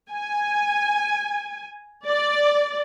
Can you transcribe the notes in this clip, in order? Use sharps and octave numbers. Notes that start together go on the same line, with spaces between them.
G#5
D5